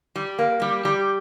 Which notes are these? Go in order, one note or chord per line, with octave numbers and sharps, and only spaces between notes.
G3
A#3
G3
G3